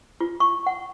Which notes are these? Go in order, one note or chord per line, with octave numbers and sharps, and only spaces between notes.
F4
C#6
F#5